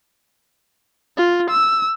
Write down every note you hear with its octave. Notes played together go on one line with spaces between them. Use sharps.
F4
E6